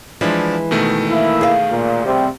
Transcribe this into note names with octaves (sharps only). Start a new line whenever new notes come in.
E3 F3 G#3 D4 E4
B2 D#3 A3
A#3 E4
G#4 F5
A#2
C3 G3 C4